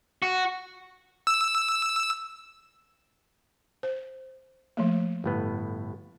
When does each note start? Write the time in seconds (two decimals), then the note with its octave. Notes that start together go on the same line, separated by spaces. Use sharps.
0.22 F#4
1.27 E6
3.83 C5
4.77 F3 A3 A#3
5.24 G1 A2 B3